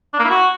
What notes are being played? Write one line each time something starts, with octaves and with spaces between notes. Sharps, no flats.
D4
A#3
E4
F#4